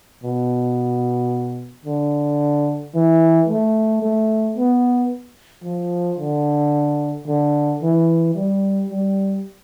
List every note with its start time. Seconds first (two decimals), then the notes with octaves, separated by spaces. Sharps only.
0.24 B2
1.86 D3
2.95 E3
3.49 A3
4.02 A3
4.57 B3
5.64 F3
6.19 D3
7.27 D3
7.82 E3
8.35 G3
8.89 G3